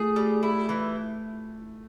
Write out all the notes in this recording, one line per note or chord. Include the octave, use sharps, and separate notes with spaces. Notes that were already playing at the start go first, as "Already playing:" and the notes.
Already playing: A3 G#4
G3
E4
E3